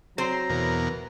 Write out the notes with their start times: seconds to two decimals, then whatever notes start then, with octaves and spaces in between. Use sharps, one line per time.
0.18 F#3 C4 C5 A#5
0.49 E2 B2 A#4